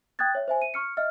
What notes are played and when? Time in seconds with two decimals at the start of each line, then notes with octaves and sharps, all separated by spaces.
0.19 G5 D#6 F#6 G#6 A6
0.35 C#5 E5
0.48 C5 E5 G#5
0.62 D#7
0.74 C#6 F6 C#7
0.97 D#5 E5 F6